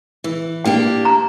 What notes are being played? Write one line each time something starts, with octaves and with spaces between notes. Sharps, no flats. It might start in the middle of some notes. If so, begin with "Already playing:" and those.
E3
A#3 D4 G4 G5
A#5